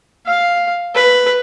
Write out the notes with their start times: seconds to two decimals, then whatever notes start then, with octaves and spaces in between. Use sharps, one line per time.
0.26 F5
0.95 B4